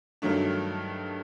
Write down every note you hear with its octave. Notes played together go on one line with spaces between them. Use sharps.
G2 D#3 F#3 A3 D4